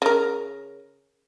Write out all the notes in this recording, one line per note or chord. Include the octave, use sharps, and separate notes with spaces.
C#3 A#4